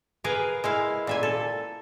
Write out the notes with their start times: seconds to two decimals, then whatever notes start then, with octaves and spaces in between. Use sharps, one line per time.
0.24 G#4 A#4 B4 F5
0.64 G#3 E4 F5
1.07 A#2 E5 G#5
1.23 A4